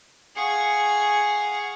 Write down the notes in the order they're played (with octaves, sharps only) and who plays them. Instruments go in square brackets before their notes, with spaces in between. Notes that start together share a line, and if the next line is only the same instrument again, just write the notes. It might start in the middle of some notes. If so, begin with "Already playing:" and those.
[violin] G#4 C#6 [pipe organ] F5 F#5